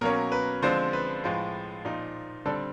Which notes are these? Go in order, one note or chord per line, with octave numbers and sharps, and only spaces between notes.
B2 F#3 A#3 C#4 A#4
B4
D3 F3 G#3 C4 C5
B4
A2 F3 G#3
A#2 F3 A#3 D#4
D3 G3 C4 A4